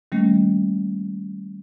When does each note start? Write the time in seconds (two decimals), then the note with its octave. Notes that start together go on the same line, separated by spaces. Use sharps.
0.12 D#3 G3 A3 A#3 C#4